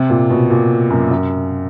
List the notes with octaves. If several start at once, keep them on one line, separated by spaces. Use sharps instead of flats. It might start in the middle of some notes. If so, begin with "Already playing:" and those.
Already playing: C3
A#2
B2
A#2
F#2
F#2